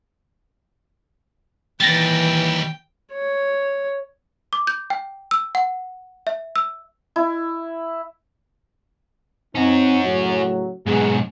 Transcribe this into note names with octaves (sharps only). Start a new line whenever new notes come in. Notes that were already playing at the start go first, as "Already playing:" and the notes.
D#2 E3 G3 G5 A6 A#6
C#5
D6
G6
G5
E6
F#5
E5
E6
E4
C4 C#4 D#4 F#4
A2 C#3 F#3
G#2 B2 F#3 G#4